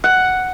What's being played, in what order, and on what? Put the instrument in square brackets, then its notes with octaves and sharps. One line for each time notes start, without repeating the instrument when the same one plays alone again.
[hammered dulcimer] F#5